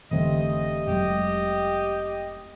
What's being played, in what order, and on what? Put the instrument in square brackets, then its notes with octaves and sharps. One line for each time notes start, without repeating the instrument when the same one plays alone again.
[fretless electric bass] F1 D3 E3 [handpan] G3 A3 C4 [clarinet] D#5
[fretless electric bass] F1 F#3 G#3 [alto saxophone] G4